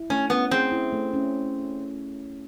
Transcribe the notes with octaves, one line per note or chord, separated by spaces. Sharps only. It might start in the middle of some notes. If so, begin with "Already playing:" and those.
Already playing: E4
A3 C#4
B3 C#4
C4 G#4
E4
A3
C#4